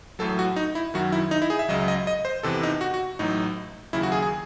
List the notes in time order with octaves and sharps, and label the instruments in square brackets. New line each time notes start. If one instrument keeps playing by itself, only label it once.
[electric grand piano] A1 A2 F#3 A4
F#4
D#4
E4
F#2 D#3 F#3 F#4
E4
D#4
E4
G#4
E5
C#2 C#3 F#3 D#5
D#5
D#5
C5
E2 C3 E3 A4
D#4
F#4
F#4
A1 A2 F#3 D#4
D#2 C#3 F#3 E4
F#4
G#4
G#4